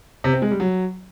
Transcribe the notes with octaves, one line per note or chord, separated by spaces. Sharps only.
C3
C4
G#3
G3
F#3